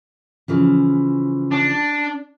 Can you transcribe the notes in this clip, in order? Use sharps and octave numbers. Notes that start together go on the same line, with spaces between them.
C#3 E3 F3
D4